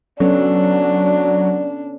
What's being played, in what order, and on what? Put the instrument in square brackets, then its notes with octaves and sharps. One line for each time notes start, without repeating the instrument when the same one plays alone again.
[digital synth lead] F#3 [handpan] B3 C#4 A4 [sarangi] D4